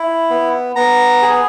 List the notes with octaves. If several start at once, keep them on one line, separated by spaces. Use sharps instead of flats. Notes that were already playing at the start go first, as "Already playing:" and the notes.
Already playing: E4
B3
B3 A#5
G#4